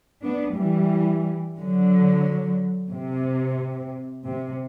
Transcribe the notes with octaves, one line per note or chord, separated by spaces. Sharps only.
B3 D4
E3 G3
D3 F#3
C3
C3